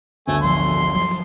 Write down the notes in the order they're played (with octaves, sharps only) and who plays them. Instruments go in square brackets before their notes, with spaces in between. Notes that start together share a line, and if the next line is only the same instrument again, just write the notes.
[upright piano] G1 D2 [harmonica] A3 G#5
[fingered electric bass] A1 F3 [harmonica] C6
[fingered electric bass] F3 F#3